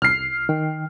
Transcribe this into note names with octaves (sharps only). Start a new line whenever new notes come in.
C2 F6 C7
D#3 G5